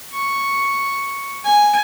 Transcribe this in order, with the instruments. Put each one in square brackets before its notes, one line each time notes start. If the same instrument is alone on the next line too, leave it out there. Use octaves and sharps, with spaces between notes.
[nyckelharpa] C#6
G#5